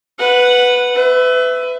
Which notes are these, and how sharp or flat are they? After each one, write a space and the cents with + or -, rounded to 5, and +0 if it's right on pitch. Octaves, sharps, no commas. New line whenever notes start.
B4 +0 F#5 -10
B4 +30 E5 +0